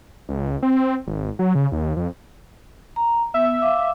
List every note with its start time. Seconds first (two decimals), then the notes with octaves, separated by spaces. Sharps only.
0.29 C#2
0.63 C4
1.07 G#1
1.39 F#3
1.55 C#3
1.72 D#2
1.97 F2
2.96 A#5
3.34 B3 E5
3.62 F5 D6